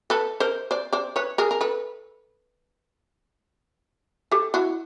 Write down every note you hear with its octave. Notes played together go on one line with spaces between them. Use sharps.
A4 B4
A#4 C5
C5 D5
C5 D5
B4 C#5
G#4 A#4
A#4
A4 B4
G4 A4
E4 F#4